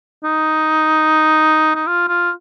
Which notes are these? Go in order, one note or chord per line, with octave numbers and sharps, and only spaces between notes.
D#4
D#4
F4
F4